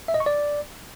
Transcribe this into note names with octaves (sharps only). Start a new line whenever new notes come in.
E5
D#5
C#6
D5